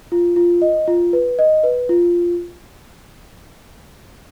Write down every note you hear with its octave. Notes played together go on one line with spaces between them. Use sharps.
F4
F4
D#5
F4
B4
D#5
B4
F4